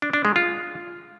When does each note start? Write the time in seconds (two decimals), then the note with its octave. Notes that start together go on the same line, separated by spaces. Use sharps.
0.02 D4
0.13 D4
0.25 G#3
0.36 F4